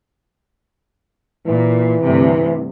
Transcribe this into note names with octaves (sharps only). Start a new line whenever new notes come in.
A#2 E3
D2 G2 C3